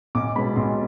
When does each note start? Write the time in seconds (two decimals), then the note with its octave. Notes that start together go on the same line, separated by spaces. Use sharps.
0.15 B1 D6
0.36 B2 G#3 B5
0.56 B1 C6